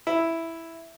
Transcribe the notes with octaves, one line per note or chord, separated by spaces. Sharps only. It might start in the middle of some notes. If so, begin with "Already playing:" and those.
E4